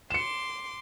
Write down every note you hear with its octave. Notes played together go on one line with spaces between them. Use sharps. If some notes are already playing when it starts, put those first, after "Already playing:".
C6 D6 C#7 E7